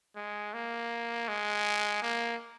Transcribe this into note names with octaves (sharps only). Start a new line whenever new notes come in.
G#3
A#3
G#3
A#3